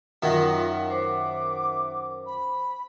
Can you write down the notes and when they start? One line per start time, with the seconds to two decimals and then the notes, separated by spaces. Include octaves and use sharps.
0.22 F#2 D#3 F4 E5 F#5
0.90 C5 D6
2.26 B5